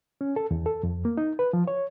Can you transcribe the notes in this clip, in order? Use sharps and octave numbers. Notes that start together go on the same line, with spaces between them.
C#4
A4
E2
A4
F2
A#3
D#4
B4
F3
C#5